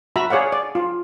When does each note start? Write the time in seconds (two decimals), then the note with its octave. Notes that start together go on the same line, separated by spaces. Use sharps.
0.16 F#4 E5 A#5 B5
0.30 G#4 C#5 D5 F5 F#5
0.52 D5
0.75 F4